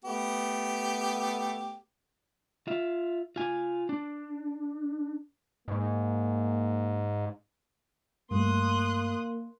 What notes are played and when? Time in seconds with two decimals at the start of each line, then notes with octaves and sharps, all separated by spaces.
0.05 A3 B3 G4
2.68 F4 E5
3.36 F4 G#5
3.89 D4
5.68 G#2 A#3
8.31 G2 G3 A3 A#3 C6 D#6 F#6